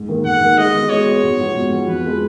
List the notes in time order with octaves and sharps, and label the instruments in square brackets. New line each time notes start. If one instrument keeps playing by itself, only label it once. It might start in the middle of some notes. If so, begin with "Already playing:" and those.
Already playing: [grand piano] G#2
D#3 A#3
[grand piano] G#2 [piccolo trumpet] F#5
[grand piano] D#3 A#3
[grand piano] G#3 [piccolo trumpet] D#5
[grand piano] B3 F#4
[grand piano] G#3 [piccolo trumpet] C#5
[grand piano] B3 F#4
G#2
F3 B3 F#4
G#2
F3 B3 F#4
[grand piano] F2 [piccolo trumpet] B4
[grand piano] F3 G#3